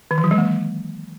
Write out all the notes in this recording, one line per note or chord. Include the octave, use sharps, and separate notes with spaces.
D#3
E3
F#3
G#3
A#3